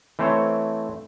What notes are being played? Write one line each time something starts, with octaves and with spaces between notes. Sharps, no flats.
E3 A3 C4 C5 C#5